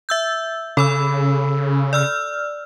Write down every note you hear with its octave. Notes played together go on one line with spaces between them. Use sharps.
E5 E6 G6
C#3 A4 B5 E6
D5 E6 F6